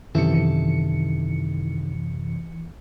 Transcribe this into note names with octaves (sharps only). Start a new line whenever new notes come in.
F#2 C3 D#3 E3 A4 E5 C#7